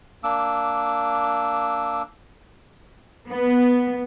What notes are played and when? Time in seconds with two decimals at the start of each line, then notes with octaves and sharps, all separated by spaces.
0.24 A#3 D4 D6 E6
3.28 B3